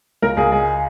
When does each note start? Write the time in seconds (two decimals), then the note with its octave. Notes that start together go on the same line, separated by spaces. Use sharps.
0.22 C#2 A#4
0.37 C#2 G#4
0.52 G#3 G#4